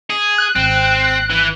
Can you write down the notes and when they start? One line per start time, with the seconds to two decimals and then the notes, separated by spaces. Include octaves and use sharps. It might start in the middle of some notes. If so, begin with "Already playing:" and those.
0.10 G#4
0.38 F#6
0.56 G#1 C4
1.30 E3